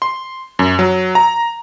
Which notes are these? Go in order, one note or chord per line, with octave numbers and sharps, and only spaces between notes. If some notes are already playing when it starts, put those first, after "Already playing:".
C6
F#2
F#3
A#5